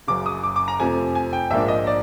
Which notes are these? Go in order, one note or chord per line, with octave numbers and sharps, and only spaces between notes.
F#1 F#2 C#3 D6
D#6
D6
D6
A#5
F2 C3 F3 A3 G#5
G#5
G5
A#1 G#2 F3 A#3 D4 E5
D#5
D5